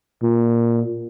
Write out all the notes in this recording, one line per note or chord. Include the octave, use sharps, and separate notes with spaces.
A#2